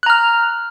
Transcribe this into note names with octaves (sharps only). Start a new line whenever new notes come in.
A#5 F6 F#6